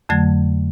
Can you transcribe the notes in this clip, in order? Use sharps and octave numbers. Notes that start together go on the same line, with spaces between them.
F2 D3 F#3 A3 G#6